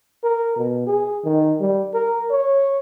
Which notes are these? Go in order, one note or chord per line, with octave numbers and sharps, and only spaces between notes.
A#4
B2
G#4
D#3
G3
A#4
C#5